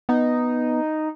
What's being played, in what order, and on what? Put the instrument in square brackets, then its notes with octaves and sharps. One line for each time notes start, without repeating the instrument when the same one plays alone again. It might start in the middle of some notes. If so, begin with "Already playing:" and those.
[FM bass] B3 [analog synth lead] D#4